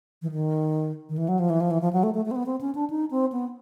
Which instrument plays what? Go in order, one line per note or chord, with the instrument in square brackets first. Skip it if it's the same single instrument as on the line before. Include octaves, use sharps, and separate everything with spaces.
[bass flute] E3
D#3
D#3
E3
F#3
F3
E3
F3
E3
F3
F#3
A3
A3
A3
C4
B3
C4
C#4
D4
D#4
C4
B3